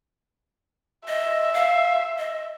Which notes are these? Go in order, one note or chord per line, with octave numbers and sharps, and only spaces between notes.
D#5 E5
F5
D#5